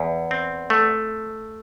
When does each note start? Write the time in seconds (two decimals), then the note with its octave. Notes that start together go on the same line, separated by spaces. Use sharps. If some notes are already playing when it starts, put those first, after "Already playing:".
Already playing: E2
0.31 C4
0.70 A3